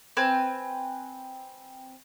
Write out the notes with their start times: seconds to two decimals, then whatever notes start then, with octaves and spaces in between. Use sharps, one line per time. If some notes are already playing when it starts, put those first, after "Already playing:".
0.17 C4 B4 G#5